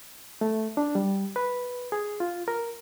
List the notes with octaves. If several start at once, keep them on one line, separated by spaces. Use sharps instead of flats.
A3
D4
G3
B4
G#4
F4
A#4